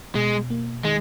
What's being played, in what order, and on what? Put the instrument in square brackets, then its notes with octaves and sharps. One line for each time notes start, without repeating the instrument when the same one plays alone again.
[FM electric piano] B2 [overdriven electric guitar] G#3
[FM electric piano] A#3
[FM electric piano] D#3 [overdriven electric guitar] G#3